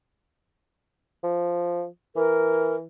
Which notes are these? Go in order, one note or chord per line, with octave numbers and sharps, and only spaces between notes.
F3
E3 A#4